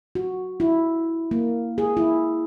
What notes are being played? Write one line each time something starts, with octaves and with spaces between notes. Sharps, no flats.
F#4
E4
A#3
G#4
E4